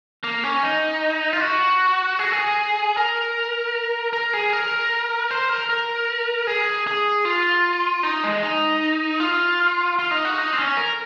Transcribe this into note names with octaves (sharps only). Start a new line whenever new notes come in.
A#3
C#4
D#4
F4
F#4
G#4
F#4
G#4
A#4
A#4
G#4
A#4
C5
A#4
A#4
G#4
G#4
F4
D#4
G#3
D#4
F4
F4
D#4
F#4
D#4
C4
C#4
A#4